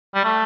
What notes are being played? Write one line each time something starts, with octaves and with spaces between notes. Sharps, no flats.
G3
A3